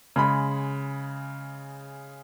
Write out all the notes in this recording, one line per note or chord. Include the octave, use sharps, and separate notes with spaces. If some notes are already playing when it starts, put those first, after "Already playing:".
C#3 G#3 B5